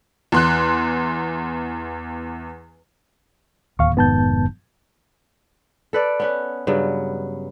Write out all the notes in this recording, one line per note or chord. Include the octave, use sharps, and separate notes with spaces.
E2 C6 F#6
D1 D#2 F5 C#6
F1 G#2 D#3 B3 A5 G6
A4 B4 D5
B3 C#4 B4
G2 C#3 F#3 B3